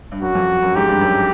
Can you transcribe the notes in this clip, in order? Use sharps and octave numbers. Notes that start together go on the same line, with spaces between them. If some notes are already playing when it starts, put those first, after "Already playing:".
G2
F#2 F#4
F2
F#2
G#2 G4
G2
F#2